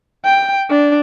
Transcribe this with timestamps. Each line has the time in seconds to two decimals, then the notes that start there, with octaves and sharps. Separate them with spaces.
0.25 G5
0.70 D4